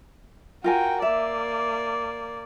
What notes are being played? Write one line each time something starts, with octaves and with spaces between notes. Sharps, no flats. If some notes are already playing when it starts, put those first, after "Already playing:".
F4 F#4 A#4 G5 G#5
A#3 D5 E5